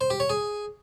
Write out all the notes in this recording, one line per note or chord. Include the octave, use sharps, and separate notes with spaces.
C5
G4
C#5
G#4